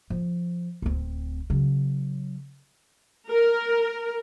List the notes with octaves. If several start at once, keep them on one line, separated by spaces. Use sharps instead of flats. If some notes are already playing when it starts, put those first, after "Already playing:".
F3
D1 C4
C#3 F#3
A#4